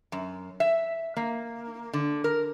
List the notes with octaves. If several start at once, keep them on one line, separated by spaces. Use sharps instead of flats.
F#2
E5
A#3
D3
A#4